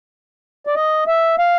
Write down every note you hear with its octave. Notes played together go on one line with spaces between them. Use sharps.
D5
D#5
E5
F5